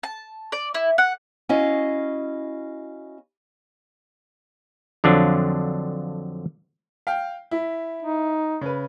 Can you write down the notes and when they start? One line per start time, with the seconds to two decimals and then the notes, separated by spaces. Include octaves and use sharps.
0.03 A5
0.52 D5
0.74 E4
0.98 F#5
1.49 C#4 E4 F#4 D#5 F5
5.04 F2 D3 F3 F#3 D4 F4
7.07 F5 G5
7.51 E4
8.03 D#4
8.61 C#3 B4